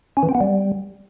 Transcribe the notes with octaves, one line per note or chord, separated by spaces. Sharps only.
C#4
E3
C4
B3
G3